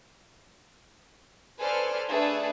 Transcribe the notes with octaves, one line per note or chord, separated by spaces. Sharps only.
A4 B4 C5 D5 G#5 F6
A3 D4 G#4 A4 B4